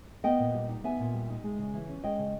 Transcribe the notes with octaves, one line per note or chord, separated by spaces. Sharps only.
B3 D#5 G5
A#2
G3
D#4
B3 E5 G#5
A#2
G3
D#4
G#3
C#3
E3
C#4
G#3 D#5 G5
C#3